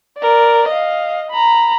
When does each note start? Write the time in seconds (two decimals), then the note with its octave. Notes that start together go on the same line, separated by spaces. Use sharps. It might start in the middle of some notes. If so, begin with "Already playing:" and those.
0.18 A#4 D5
0.68 D#5 F5
1.31 A#5 B5